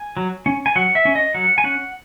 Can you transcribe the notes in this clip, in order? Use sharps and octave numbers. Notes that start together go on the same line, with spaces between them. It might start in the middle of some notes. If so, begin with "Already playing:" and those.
Already playing: G#5
F#3
C#4
G#5
F#3 F#5
E5
C#4
D#5
F#3 F#5
G#5
C#4 F#5